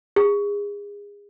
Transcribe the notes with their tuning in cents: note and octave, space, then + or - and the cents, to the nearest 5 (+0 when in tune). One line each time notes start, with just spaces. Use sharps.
G#4 -30